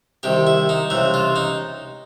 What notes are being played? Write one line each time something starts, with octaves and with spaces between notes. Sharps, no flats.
C2 C3 D#3 G4
E4
D#4
C#2 C3 E3 E4
F4
D#4